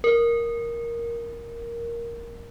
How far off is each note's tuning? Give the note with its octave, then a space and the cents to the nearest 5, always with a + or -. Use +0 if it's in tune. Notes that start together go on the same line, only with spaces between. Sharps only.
A#4 +5